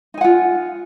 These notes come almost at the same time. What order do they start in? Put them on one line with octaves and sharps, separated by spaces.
D#4 G#5 F#5 F4